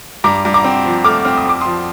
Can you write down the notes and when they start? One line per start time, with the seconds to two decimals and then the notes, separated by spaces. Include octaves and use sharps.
0.24 G2 A#5 D6
0.45 G2
0.54 A#5 D6
0.64 C4
0.85 F3
1.04 A3 D6 F6
1.25 C4 F6
1.37 D#6
1.45 F2 D6
1.61 F3 C6 D#6